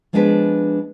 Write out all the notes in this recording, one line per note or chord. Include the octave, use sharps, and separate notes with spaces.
F3 G#3 B3 D4 G#4 B4